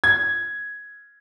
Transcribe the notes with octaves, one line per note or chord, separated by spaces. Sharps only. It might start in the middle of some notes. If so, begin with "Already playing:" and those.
G#6